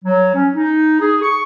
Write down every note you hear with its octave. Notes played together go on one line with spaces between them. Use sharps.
F#3
C#4
D#4
G#4
C#6